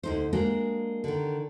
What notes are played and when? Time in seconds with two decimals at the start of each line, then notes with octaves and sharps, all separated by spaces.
0.03 D2 D#4 C5
0.33 G#3 A#3 D4 F#4 A#4
1.04 D3 D#3